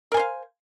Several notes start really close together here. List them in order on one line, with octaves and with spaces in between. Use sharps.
A#4 G#5 C5 F5